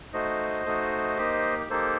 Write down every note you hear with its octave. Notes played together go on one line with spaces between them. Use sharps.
A3 D#4 F#4 C5 D#5
A3 D#4 F#4
A#3 D#4 G4
A#3 D#4 G4 A4 C5